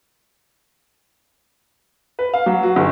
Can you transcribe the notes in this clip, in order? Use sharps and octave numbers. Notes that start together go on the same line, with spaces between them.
B4
F5
F#3
F#4
G1